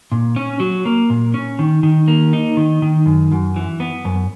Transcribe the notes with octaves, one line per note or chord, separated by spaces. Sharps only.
A#2
C#4
F#3
A#3
A#2
C#4
D#3
D#3
A#3
D#4
D#3
D#3
F#2
F#2
E3
B3
F#2